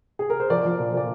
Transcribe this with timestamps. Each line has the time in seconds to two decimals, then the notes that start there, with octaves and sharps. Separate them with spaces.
0.19 G#4
0.30 A#4
0.40 C5
0.50 F3 A#4 D5
0.65 F3
0.79 A#2
0.94 A#2 D5